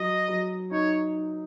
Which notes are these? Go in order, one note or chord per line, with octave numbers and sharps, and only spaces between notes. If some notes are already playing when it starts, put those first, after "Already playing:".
Already playing: F#3 D#5
F#3
D#4 C#5